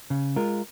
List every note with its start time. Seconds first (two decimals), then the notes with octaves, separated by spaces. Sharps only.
0.10 C#3
0.36 G#3 F4 A#4